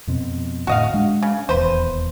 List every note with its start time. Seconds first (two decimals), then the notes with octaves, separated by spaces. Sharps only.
0.07 F2 B2 C4
0.67 D2 A2 F#4 D#5 F5
0.94 G#3 D4
1.23 C#3
1.49 D#1 E2 B4 C5